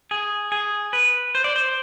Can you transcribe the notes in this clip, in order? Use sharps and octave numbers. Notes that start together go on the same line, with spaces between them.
G#4
G#4
B4
C5
D5
C5